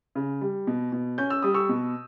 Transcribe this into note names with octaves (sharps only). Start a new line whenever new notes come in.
C#3
G3
B2
B2
C#4 G6
E6
G3 D#6
C#6 E6
B2